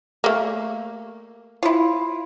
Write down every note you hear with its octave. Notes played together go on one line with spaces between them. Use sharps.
A3 A#3
E4 F4